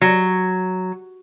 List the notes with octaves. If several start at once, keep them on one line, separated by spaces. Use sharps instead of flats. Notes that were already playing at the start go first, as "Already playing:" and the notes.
F#3